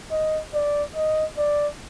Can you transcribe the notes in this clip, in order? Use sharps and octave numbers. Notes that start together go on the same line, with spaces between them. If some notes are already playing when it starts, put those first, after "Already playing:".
D#5
D5
D#5
D5